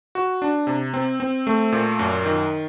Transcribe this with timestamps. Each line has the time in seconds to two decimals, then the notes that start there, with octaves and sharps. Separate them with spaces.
0.15 F#4
0.42 D4
0.67 C3
0.94 C4
1.20 C4
1.47 A3
1.72 A#2
1.99 F#2
2.25 D#3